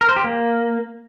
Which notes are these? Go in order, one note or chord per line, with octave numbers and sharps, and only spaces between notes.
A#4
C5
G4
A#3